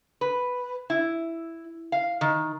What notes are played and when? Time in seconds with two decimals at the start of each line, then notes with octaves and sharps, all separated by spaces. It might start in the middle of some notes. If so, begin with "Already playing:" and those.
0.21 B4
0.90 E4
1.92 F5
2.21 D#3